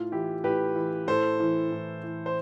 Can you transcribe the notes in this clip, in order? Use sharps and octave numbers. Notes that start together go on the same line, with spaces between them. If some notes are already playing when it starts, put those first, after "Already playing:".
Already playing: A2 F4
E3 E4 G4
A2 G4 B4
E3
A2 A4 C5
E3
A2
E3
C5